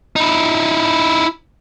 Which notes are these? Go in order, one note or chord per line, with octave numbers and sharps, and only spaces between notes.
D#4 E4